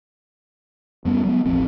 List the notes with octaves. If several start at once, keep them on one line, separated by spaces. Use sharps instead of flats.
F#2 G3 B3 C#4
F#3 G#3 B3
E1 A1 F3 C4